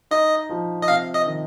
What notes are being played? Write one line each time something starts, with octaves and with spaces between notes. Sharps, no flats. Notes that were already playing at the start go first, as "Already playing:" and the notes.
D#4 D#5
F3
D#5
C3 F5
D#5
D#3